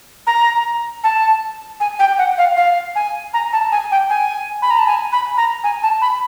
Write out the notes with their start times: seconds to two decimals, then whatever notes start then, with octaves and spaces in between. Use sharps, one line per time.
0.27 A#5
1.04 A5
1.80 G#5
1.99 G5
2.18 F#5
2.38 F5
2.57 F5
2.95 G#5
3.33 A#5
3.53 A5
3.72 G#5
3.91 G5
4.10 G#5
4.62 B5
4.70 A#5
4.79 A5
4.87 G#5
5.12 B5
5.37 A#5
5.64 G#5
5.83 A5
6.01 B5